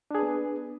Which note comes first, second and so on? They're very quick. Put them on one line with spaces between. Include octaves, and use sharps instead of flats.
D4 G#4 B4 B3